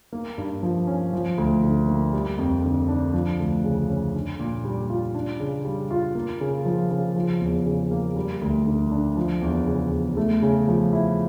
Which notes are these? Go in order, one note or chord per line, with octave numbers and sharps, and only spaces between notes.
A#3
G2
F3
C#4
F3
D2
D3
A#3
G3
F2
D3
D4
F3
D2
C#3
C#4
D4
A#2
G3
F4
D4
C#3
G3
F4
A#3
C#3
F3
C#3
F3
E2
C#3
A#3
G3
D2
D3
D4
F3
E2
C#3
E2
A3
C#3
F3
E4